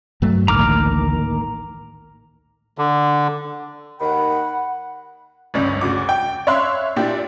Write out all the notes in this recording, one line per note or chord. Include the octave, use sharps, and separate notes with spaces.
G2 F#3 A3
A1 D2 A2 D#3 A#3 A#5 D6 F6
D3
D#2 D#3 F#5 B5
G1 C#2 C#4 D5
D2 C#3 F#4 D6
G5
C#5 E5 F5 C6 F#6
A#2 D4 E4 G4